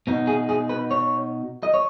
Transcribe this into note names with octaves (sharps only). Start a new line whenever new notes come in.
B2 B3 D#4
G#4
G#4
B4
C#5
D#5
C#5